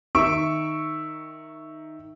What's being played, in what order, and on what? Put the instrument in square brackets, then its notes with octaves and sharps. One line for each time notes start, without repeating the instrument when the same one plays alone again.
[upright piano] D#3 E5 C#6 E6 D7